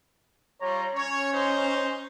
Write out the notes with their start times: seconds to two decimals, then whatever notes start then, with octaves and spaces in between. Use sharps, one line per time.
0.61 G3 F4 C#5 A#5
0.95 C#4 C#5
1.33 D#4 C5